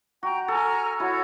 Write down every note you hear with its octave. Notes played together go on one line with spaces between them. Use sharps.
F#4 G5 A#5
A4 G#5 A#5 F6
E4 F#4 C#5